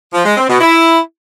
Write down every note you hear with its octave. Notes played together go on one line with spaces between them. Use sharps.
F3
G#3
C4
B2
E4